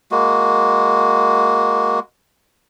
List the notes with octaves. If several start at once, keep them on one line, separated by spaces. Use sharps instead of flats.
G#3 A#3 F#4